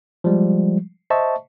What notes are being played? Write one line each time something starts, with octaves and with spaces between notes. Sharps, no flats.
F3 G3 G#3
C5 D#5 E5 A5 C#6